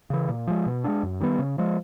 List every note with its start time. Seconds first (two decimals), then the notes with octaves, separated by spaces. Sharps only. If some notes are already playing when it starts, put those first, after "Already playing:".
0.10 C#3 E3
0.29 A#2
0.47 F3 G#3
0.66 B2
0.84 G#3 B3 D4
1.03 F#2
1.20 D#3 G3 B3
1.39 C#3
1.58 F3 G#3